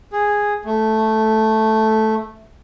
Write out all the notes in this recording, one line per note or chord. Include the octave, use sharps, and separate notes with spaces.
G#4
A3